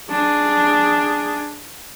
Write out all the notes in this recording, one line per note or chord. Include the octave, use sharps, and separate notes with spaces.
D4 G#4